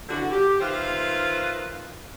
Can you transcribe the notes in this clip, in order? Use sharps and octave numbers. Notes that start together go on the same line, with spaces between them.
D3 E3 F#4
G4
D#3 F4 B4 C5 E5 F5